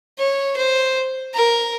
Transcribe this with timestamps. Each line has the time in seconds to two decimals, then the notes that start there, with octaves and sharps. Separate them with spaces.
0.18 C#5
0.57 C5
1.34 A#4